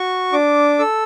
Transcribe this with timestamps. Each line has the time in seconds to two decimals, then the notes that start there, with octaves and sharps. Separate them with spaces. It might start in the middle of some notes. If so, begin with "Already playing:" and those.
Already playing: F#4 C#6
0.32 D4 D6
0.79 A4 E6